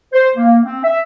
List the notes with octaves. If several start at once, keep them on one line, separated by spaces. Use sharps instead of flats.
C5
A#3
C4
E5